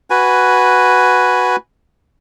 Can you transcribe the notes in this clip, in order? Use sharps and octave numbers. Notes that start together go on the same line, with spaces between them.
F#4 B4 G#5